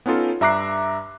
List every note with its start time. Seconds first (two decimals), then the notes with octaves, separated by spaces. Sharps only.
0.06 B3 C#4 D#4 F4 A4
0.41 G2 E5 A#5 D6 F#6 C7